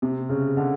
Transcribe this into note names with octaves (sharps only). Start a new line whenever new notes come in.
C3
C#3
D3